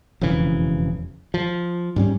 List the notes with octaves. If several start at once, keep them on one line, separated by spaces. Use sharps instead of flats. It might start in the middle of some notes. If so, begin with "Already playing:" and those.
E1 F2 C#3 E3
F3
G#2 G3 C#4